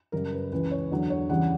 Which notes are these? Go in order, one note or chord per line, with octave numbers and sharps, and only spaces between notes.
F#2 C#3 G3 A#4
B4
C#2 C#3 E3 B4
C#5
E2 D3 F#3
C#5
E2 C#3 E3 G3 F#5